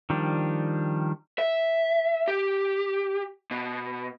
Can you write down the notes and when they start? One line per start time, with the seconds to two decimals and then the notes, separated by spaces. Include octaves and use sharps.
0.10 D#3 F3 G3 D4
1.39 E5
2.28 G4
3.51 B2